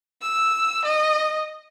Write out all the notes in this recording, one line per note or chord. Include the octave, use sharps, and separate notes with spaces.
E6
D#5